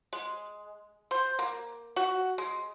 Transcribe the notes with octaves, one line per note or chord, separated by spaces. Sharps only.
G#3
C5
A#3
F#4
G#3